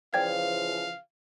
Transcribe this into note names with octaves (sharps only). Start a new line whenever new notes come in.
C#3 E3 F3 D5 F5 G5 G#6